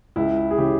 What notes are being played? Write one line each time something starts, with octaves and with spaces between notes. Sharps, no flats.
C#2 E4
G#4
C#3 E3 G4